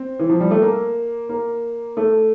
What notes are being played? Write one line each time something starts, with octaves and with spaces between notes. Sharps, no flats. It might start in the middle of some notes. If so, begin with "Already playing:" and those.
Already playing: C4
E3
F3
G3
A3
A#3
A#3
A3